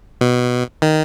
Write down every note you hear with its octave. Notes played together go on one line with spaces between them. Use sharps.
B2
D#3